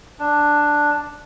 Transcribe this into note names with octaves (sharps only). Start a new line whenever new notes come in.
D4